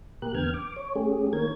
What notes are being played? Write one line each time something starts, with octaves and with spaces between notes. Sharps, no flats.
A#2 G4 A#4 F#6
E2 D3 B3 G5 F6 G#6
D6
C#5
A3 C#4 G4 G#4
D#3 A#3 A#4 C#5 G#6